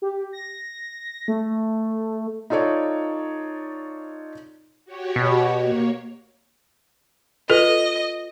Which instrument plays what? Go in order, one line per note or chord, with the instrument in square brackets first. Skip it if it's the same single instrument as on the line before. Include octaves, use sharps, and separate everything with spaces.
[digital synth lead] G4
A#6
A3
[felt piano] D#4 F4 A4 C#5 D5
[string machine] F#4 G4 C#5
[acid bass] B2
[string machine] A#3 C#5
[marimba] F4 B4 [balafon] A4 [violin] D#5